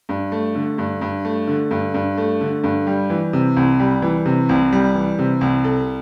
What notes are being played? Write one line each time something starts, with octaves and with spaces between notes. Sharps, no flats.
G2
A3
D3
G2
G2
A3
D3
G2
G2
A3
D3
G2
G3
E3
C3
C2
G3
E3
C3
C2
G3
E3
C3
C2
A4